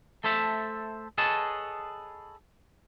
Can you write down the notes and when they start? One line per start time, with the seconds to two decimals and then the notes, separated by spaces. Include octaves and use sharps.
0.24 A3 A4 C5 E5 A5
1.18 G#4 A4 B4 C#5 D#5 A5